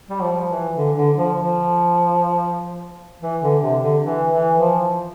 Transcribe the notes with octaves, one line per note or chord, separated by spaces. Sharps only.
G3
F3
E3
D3
D3
F3
F3
E3
D3
C3
D3
E3
E3
F3